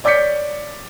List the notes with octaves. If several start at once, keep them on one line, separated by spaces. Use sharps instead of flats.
C#5 D5 D6 G6 B6 C#7